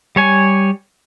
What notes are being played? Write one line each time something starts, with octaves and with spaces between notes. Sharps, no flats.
G3 C#5 G#5